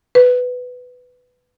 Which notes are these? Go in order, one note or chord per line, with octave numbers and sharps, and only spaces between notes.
B4